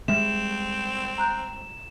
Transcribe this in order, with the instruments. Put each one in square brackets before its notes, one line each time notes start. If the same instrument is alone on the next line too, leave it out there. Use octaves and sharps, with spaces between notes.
[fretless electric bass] G3 G#3 [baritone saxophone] C4 [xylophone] E5 [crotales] E7
[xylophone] A#5 F#6 G6